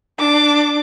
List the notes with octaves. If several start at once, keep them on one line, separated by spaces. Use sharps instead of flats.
D4 D6